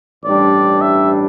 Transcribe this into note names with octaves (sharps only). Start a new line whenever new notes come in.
A1 G2 G3 D4 D5
E5